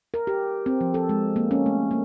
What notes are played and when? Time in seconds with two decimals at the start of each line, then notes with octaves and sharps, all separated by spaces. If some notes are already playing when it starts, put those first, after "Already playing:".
0.14 A#4
0.27 G4
0.66 C4
0.81 F3
0.94 A4
1.09 G#3
1.36 A#3
1.51 C#4
1.66 A3
1.91 A#3